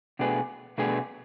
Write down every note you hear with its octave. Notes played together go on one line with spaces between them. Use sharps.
B2 A3 D4 G#4 B4
B2 A3 D4 G#4 B4